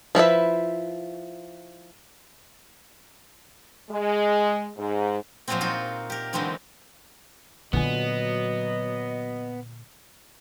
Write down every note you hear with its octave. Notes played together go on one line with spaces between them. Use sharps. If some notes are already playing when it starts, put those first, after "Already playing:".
F3 E4 B4 E5
G#3
G#2
A#2 F3 F#3 G#3 A#3 C4
D#4 F4 F#4
G4 A#4
D3 E3 F#3 G#3 C4 D#4
A#2 D3 F#3 B3 F4 D#5 G#5